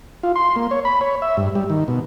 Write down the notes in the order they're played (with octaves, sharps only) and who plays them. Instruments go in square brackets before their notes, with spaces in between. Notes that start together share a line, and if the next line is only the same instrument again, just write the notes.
[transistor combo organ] F4
C6
A#3
C#5
B5
C#5
E5
G2
G3
D#3
B2